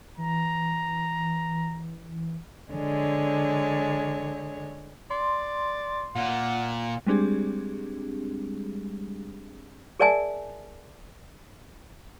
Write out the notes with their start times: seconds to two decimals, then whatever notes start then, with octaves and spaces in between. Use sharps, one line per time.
0.18 E3 A#5
2.72 D3 G#3 C#5
5.10 D5 C6
6.16 A#2 F#5
7.07 G3 G#3 C4 D4 G4 G#4
10.00 G#4 A#4 D5 E5 G#5 A5